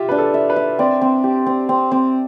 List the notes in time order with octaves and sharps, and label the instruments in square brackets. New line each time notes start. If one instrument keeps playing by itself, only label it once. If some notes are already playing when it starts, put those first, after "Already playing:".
Already playing: [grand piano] F4 G4 [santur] E5
[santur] D4 [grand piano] B4
[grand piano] A4
[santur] E5
[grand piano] B4
[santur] E5
[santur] C4 [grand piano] D5
[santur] C4
G4
C4
C4
C4